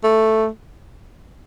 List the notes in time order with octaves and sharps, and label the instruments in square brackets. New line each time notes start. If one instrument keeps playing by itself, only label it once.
[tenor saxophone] A3